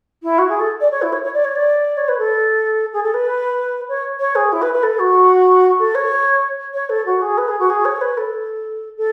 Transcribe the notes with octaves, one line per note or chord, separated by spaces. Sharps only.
E4
F#4
G#4
A4
D5
C#5
E4
C#5
C#5
D5
C#5
D5
C#5
B4
A4
G#4
A4
B4
C#5
C#5
G#4
E4
B4
B4
A4
F#4
A4
C#5
C#5
A4
F#4
G#4
B4
G#4
F#4
G#4
C#5
B4
A4
A4